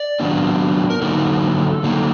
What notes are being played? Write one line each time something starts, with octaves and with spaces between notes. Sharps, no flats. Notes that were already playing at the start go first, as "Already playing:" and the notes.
Already playing: D5
D#3 F#3 B3 D4
A#4
D3 F#3 A#3 D#4 A4
D3 F#3 A#3 D#4